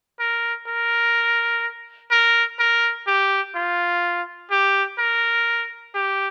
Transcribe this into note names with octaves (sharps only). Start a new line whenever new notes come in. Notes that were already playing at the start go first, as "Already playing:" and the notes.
A#4
A#4
A#4
A#4
G4
F4
G4
A#4
G4